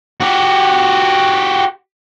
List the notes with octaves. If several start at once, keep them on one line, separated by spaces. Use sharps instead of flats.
F#4 G4